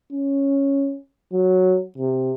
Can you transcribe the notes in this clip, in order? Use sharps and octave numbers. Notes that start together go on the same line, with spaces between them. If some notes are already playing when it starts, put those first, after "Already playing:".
C#4
F#3
C3